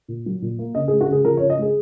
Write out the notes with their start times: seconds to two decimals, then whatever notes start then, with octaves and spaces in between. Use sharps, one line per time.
0.08 A#2
0.26 F#3
0.42 A#2
0.59 A#3
0.75 C#3 D#5
0.88 G#4
0.92 G#3
1.01 F#4
1.08 C#3 G#4
1.25 F3 A#4
1.37 C#5
1.41 C#3
1.50 D#5
1.58 G#3 G#4